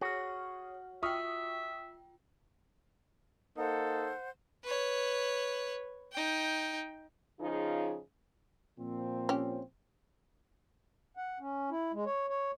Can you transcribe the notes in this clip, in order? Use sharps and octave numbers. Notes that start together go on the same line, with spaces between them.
F#4 G#4 C#5 F6
F4 E5 G5 C#6 D#6 F6
A#3 D#4 A4 C5 F#5
B4 C#5
D#4 G5
C#3 F3 D#4 F4 G#4
A#2 F3 C4
C#4 G4
F#5
C#4
E4
G#3
C#5
C#5